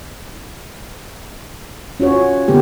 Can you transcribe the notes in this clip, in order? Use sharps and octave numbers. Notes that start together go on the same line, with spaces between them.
C#4 F4 F#4 C#5
D3 A#3 B3 G4